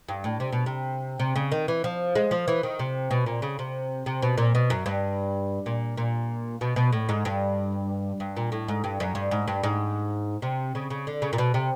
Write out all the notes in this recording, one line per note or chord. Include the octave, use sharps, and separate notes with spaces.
G2
A2
C3
B2
C3
C3
C#3
D#3
E3
F3
G#3
F3
E3
D#3
C3
B2
A#2
C#3
C3
C3
B2
A#2
B2
F#2
G2
A#2
A#2
B2
B2
A2
G#2
G2
G2
A#2
A2
G#2
G2
F#2
G2
G#2
G2
G#2
C3
C#3
C#3
D3
C#3
A#2
B2
C3